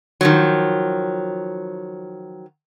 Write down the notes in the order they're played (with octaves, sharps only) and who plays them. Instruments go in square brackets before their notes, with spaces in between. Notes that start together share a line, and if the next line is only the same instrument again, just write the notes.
[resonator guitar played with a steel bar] D#3 F3 F#3